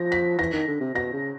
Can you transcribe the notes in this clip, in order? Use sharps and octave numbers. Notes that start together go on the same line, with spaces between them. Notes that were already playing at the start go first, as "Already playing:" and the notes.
Already playing: F3 A#6
B6
E3 A#6
D#3
D3
C3
B2 A#6
C#3